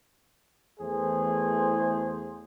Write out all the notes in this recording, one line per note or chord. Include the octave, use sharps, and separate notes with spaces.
E2 E3 A3 G#4 C5